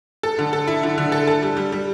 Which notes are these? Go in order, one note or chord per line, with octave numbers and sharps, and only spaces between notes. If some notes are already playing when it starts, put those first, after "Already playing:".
A4
D3
A4
E4
D3
D3
A4
A4
G3
G3
G3